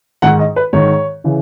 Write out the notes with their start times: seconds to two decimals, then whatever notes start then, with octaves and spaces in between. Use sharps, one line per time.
0.22 G#2 D#3 F#5
0.39 D#5
0.56 B4
0.73 G#2 D#3 C#5
1.24 C#3 E3